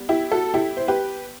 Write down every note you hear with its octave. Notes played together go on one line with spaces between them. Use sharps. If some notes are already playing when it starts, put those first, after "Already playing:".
Already playing: G3 B3
E4 G4
F#4 A4
E4 G4
C5
G4 B4